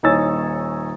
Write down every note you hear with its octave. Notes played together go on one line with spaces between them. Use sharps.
D#1 D#4 C#5 G#5 E6 A6